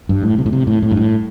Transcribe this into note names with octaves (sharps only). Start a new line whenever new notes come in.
G2
A2
C3
A2
C3
A2
A2
G2
A2